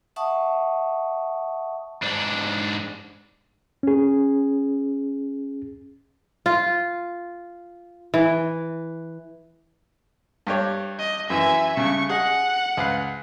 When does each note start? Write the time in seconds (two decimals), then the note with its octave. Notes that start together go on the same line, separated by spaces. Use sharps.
0.16 E5 F#5 A5 C#6 D#6
2.02 G#2 D4
3.83 C#4 G#4
6.46 F4
8.14 E3
10.47 G2 G4 C#5
10.99 D#5
11.30 F#2 E3 E5 G#5
11.77 G2 C#3 C#6
12.09 G#4 D#5 F#5
12.77 C#2 B4 F5